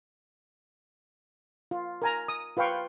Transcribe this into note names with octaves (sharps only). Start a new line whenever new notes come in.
F4
A#4 G#5 A#5
D#6
F4 B4 F5 G5 C#6